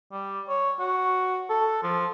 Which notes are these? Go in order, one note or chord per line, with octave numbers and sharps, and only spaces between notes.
G3
C#5
F#4
A4
F3